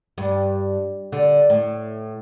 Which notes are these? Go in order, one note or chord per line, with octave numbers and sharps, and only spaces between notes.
G2
D3
A2